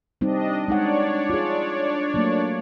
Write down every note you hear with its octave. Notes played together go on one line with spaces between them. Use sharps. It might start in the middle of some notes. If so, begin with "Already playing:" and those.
G3 C4 D4 D#4 D#5
G#3 D4 D#4 C#5 D5 F#5
F4 G#4
F#3 A3 A#3